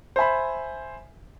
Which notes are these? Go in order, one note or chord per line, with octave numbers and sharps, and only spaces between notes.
C5 E5 G#5 B5